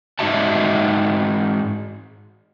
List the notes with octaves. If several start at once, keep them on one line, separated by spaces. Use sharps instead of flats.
G#2 D#4 F#4 E5 A5